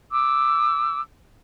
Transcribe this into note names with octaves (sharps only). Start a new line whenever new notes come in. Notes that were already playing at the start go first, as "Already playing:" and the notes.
D6 E6